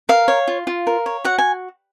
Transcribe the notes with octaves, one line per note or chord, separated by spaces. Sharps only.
A#4 F5
C#5
F4
F4
A#4
C#5
F#4 F#5
G#5